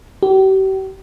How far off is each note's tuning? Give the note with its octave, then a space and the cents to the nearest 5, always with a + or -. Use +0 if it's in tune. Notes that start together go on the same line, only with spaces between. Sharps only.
G4 -40